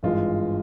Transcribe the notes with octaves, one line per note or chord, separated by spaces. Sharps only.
G#1 G2 E3 G#3 F4